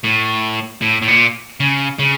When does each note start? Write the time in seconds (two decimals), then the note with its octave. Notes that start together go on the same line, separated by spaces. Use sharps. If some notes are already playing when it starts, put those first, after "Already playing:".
0.04 A2
0.82 A2
1.02 A2
1.08 A#2
1.60 C#3
1.99 C#3